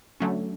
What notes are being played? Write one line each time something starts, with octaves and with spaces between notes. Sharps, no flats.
D3 F#3 A3 C#4